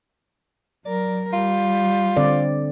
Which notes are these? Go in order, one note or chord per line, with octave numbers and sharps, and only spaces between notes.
F#3 A#4 D5
G3 F4
D3 C4 D5